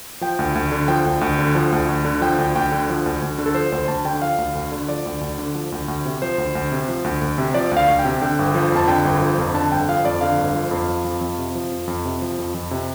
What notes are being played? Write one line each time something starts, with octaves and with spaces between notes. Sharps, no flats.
F3 G5
D2
D2
D3
F3 G5
D2
D2
D3
F3
D2
D2
D3
F3 G5
D2
D2 G5
D3
F3
D2
D2
D3
A4
F3 C5
D2 C5
D2 A5
D3 G5
F3 F5
D2
D2
D3
F3 D5
D2
D2
D3
F3
D2
D2
C3
F3 C5
D2
D2
C3
F3
D2
D2
C3
F3 D5
D2
F5
D2
G5
C3
D3 G5
G1
F3
F2 A5
D3 G5
G1
F3
F2
D3 A5
G1 G5
F3 F5
F2 D5
D3 F5
G1
F3
F2
F3
F2
F2
C3
F3
F2
F2
C3
F3
F2
F2
C3